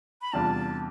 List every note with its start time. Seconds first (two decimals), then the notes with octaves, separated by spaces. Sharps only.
0.22 B5
0.33 E2 C3 G3 D4 F4 A5